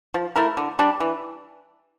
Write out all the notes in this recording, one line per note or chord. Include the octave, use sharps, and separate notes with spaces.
F3
A3 E4 A#4
D3
G3 D4
E3